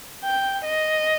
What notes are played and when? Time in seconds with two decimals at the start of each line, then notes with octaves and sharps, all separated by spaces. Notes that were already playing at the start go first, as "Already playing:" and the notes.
0.24 G5
0.65 D#5